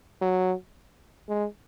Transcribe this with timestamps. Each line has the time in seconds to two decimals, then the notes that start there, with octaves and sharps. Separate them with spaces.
0.21 F#3
1.29 G#3